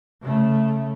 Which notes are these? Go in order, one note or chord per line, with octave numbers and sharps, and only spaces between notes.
C#3 A3